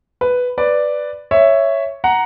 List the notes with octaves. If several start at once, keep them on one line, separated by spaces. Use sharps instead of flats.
B4
B4 D5
C#5 E5
F#5 A#5